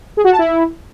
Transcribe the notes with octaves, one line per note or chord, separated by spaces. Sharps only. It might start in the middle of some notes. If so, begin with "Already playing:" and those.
G#4
F#4
A5
E4